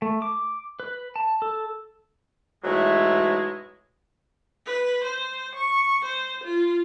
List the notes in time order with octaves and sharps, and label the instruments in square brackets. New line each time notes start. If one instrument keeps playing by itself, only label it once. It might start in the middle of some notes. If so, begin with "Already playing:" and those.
[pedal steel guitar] A3
D6
B4
A5
A4
[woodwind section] G#2 B2 E3 F#3 G#3 A3
[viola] B4
C5
C#6
C5
F4